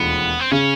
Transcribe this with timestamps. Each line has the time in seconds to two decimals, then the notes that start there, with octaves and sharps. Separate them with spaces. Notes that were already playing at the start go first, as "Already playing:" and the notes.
Already playing: E1 D#2 F3 A3 B3
0.39 C4
0.52 C#3 C#4